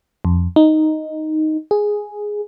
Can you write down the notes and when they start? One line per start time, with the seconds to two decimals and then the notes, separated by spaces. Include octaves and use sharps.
0.25 F2
0.56 D#4
1.71 G#4